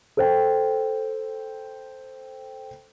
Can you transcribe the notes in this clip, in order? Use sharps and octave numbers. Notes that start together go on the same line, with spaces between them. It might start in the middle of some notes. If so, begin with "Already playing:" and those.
A4 C5 G5